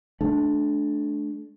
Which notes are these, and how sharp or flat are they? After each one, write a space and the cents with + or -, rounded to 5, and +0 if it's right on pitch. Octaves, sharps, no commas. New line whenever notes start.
A3 -30 D4 +0